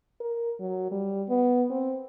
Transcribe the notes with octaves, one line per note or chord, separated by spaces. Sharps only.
A#4
F#3
G3
B3
C4